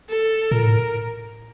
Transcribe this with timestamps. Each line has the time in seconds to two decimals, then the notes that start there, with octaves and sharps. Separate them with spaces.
0.10 A4
0.51 A#2 A#4
0.64 A2